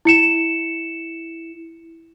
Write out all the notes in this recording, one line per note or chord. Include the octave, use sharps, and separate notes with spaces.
E4 C#7 E7